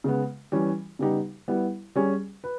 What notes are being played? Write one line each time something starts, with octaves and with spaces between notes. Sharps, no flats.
C#3 G#3 B3
E3 G3 C#4
C#3 G3 B3 D#4 G4
G3 B3 E4
G3 C#4 G#4
B4